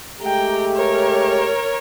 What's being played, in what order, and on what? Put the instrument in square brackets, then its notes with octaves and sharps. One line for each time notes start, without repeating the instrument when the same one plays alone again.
[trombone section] G#3 A3 G4 [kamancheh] G5 A#5
[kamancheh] A#4 C#5